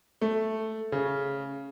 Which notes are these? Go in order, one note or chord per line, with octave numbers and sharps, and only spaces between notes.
A3
C#3